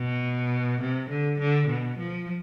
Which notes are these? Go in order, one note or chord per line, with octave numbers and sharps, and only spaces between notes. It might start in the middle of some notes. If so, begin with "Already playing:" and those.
Already playing: B2
C3
D3
D3
B2
F3